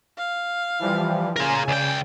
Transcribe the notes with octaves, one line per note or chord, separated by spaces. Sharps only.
F5
E3 F3 G3
C#3 F4 A#4 G#5
C#2 D5 G5